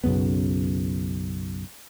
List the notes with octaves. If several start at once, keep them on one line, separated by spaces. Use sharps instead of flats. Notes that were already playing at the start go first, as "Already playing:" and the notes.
B1 F#2 C#3 B3